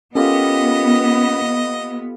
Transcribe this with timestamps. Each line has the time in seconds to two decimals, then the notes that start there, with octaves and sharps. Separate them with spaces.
0.15 B3 C#4 F4 G4 A4 A#4 D#5